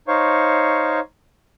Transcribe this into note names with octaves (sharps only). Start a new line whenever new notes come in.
D#4 C5 C#5 F5 C#6